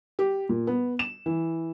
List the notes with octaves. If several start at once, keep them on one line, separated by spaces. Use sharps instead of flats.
G4
A#2
B3
E7
E3